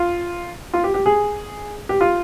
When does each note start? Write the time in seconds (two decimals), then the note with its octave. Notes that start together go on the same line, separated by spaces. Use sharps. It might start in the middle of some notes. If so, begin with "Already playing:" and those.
Already playing: F4
0.74 F4
0.84 G4
0.94 G4
1.06 G#4
1.89 G4
2.01 F4